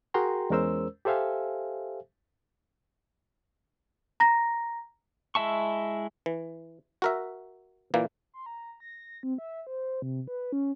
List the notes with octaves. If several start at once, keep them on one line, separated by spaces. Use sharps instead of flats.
F#4 G#4 A#4 G5 A#5 C6
E2 G#3 C#4 A#4 C5 E6
G4 A4 C5 E5 F5 G#5
A#5 A#6
G#3 E4 E5 A5 C#6
E3
F#4 A#4 E5
A#2 E3 A#3
C6
A#5
A#6
C4
E5
C5
C3
B4
C#4